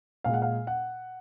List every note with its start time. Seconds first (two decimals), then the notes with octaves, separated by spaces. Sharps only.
0.24 A#2 G#3 F5
0.34 F#5
0.42 F5
0.67 F#5